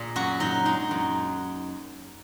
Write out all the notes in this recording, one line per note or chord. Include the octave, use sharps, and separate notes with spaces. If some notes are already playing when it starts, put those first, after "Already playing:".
Already playing: A#2 G#4
F#2 F#4
F#3 D#4
G#3 D#4
F#2